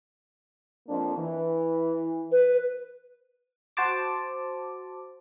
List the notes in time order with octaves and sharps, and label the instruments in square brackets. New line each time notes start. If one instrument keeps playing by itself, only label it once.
[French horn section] F2 A#3 D4
E3
[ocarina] B4
[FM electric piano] F#4 C5 A5 D6